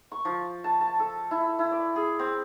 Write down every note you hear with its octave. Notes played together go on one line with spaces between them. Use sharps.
C#6
F3
A5
A5
A4
E4
E4
D5
G#4
C4